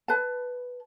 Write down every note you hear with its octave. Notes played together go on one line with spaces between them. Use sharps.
B4 A5